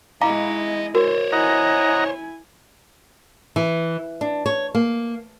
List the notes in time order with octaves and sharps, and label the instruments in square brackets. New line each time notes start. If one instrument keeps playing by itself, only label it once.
[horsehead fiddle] G#3 E4 [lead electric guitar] D#5 B5 [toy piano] F5 A#5 D6
[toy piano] F#4 A#4 [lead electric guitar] C5 C#5
[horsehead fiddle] E4 G#5 [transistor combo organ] D#5 F#5 A#5
[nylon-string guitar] E3
D4
C#5
A#3